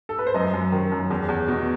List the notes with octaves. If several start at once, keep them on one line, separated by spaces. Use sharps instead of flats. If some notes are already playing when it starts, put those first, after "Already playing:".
A4
B4
C5
F#2 D#5
F#2
D#3
F#2
E2
E2
B2